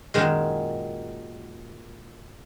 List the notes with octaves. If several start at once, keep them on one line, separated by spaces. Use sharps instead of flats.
F#2 A#2 D#3 G#3